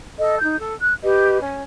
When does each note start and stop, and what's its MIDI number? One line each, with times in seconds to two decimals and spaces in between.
0.18 0.40 69
0.18 0.40 75
0.41 0.55 63
0.41 0.55 91
0.59 0.74 69
0.80 0.94 90
1.03 1.39 67
1.03 1.39 71
1.03 1.39 75
1.40 1.62 61